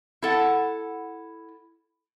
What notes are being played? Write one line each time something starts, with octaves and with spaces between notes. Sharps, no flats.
E4 A4 F#5